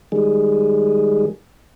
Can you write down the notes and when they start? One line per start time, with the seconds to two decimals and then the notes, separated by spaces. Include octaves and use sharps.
0.12 D#3 G3 G#3 G#4